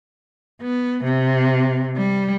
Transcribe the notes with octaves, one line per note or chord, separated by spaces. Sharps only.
B3
C3
G3